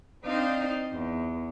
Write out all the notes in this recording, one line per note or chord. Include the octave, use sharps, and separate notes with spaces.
C4 D4 D#4 C5 D5 F5
E2